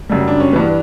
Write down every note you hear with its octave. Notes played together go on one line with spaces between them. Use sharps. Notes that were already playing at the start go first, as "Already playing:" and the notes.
F#2 C#3 G3
D4
C#4
G2 E3 G3 B3